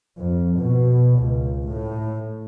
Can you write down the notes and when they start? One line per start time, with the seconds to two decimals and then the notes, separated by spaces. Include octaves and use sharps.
0.18 F2
0.59 B2
1.17 C#2
1.68 A2